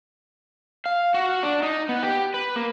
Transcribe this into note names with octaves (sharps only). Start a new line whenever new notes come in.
F5
F#4
D4
D#4
B3
G4
B4
A#3